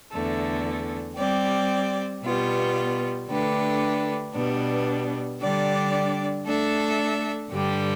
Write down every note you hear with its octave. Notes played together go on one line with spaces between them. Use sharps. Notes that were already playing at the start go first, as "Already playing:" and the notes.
E2 D3 A3
G3 C4 G4 D5
B2 G3 B3 F4
D3 A3 D4 G4 B4
B2 G3 B3 D4
D3 G3 D4 G4 D5
A3 D4 A4 E5
G2 D3 G3 D4 G4